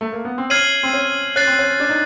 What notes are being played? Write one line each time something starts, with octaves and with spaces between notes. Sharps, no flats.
A3
A#3
B3
C4
C#4 F6 G#6 C7 D#7 F#7
C4
C#4
C#4 F#6 A6 C7
C4
C#4
D4
D#4